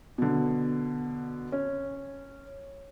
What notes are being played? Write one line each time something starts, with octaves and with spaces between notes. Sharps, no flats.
B2 D3
C#4